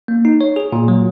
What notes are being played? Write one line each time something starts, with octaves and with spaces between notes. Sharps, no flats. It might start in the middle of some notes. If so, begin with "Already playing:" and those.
A#3
D#4
C#5
G#4
A#2
F#3